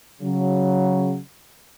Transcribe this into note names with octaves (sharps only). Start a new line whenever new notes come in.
C#3 F#3